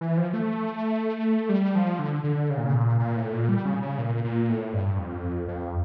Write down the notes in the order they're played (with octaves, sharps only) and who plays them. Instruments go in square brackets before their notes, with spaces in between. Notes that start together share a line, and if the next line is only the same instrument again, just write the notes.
[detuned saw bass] E3
F3
A3
G3
F3
D3
D3
C#3
A#2
C#3
A#2
A#2
A2
A#2
G3
C#3
C#3
A#2
A#2
A2
G2
F2
F2